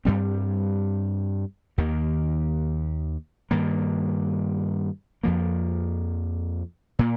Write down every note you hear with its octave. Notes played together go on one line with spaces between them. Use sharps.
G2 G3 C4
D#2 D#3 A#3
G2 D#3 A#3
F2 F3 A#3
A#2 A#3